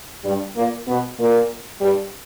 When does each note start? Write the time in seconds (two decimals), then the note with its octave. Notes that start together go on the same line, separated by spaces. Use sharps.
0.24 G2 G3
0.56 A#2 A#3
0.87 B2 B3
1.19 A#2 A#3
1.81 G2 G3